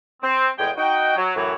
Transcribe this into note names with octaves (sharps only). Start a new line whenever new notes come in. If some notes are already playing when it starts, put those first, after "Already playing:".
C4
E2 A2 G#3 G#4 D#5 G5
D#4 F#4 G5
F#3
F#2 A2 E3 F#3 E4 C#5